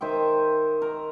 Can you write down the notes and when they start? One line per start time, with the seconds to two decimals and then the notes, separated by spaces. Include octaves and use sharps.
0.01 D#3 C5 E5 G5
0.82 A#4